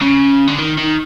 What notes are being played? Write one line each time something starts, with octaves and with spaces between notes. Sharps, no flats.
C#3
D3
D#3
D#3